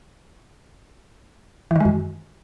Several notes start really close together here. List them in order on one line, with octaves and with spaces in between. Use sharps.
E3 D#3 G#3 F#2